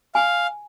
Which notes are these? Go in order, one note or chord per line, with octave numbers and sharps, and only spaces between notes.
F5 G#5